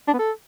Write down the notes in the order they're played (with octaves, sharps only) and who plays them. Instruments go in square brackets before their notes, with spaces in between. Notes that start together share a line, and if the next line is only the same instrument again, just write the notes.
[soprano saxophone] D4
B3
A4